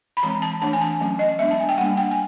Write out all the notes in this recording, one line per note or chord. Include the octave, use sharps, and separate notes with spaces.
B5
E3 G#3 C4 A#5
A5
E3 A3 D4 A5
G#5
A5
F#3 A3 C#4
D#5
G#3 B3 D4 E5
A5
G#5
G5
G3 A#3 D4 F#5
G5
G#5